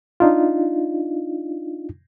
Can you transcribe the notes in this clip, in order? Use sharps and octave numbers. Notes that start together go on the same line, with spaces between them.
D4 D#4 F4